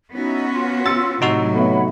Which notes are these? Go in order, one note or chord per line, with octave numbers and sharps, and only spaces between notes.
B3 C#4 D#4 E4 F#4
F4 C6
E6 A6 C#7
A2 C3 F#3 D#4 F#4
A3 B3 C#5 E5 F#5 B5